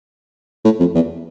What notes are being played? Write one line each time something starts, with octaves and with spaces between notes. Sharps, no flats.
A2
F2
E2